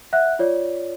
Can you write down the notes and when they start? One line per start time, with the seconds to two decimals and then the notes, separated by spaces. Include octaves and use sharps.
0.13 E5 F#5 F#6
0.39 F4 C#5 D5